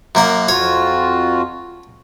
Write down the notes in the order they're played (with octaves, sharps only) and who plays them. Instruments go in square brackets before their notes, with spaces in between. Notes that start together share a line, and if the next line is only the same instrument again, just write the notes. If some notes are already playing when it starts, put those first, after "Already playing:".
[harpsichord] F#2 A#3 F#5
[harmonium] F2 F4 F#4 [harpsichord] C#5